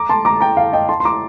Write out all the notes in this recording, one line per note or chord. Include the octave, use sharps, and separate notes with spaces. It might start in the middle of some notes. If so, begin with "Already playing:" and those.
Already playing: A#5 D6
A5 C6
A#5 D6
G5 A#5
F5
D#5 G5
A5 C6
C6
A#5 D6